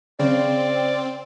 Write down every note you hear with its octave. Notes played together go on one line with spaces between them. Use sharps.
C#3 C4 D5